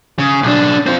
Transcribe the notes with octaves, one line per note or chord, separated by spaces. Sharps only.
C#3
B1 D4
C4 F4